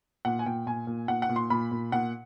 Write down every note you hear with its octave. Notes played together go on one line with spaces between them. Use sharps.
A#2 F#5
G#5
A#2 G5
A#2 G#5
A#2
A#2 F#5
F#5
A#2
C6
A#2 B5
A#2
A#2 F#5